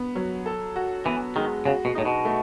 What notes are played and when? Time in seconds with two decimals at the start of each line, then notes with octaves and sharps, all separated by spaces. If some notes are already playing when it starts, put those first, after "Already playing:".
Already playing: B3
0.15 F#3
0.46 A4
0.76 F#4
1.05 E3 B3
1.36 D#3 G#3
1.65 C#3 F#4
1.85 B2
1.95 A2 D#4
2.05 B2
2.25 A3